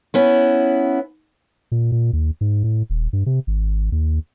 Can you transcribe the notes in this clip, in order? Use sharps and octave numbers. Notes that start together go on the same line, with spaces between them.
B3 C#4 E4
A#2
A#2
D#2
G#2
A2
D#1
G2
C3
G#1
D#2